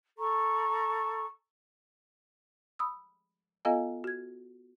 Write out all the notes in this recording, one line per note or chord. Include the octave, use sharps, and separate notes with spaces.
A4 A#5 C#6
B5 D#6 E6
B3 F4 A4 D#5 F5 G#5
F#4 G#6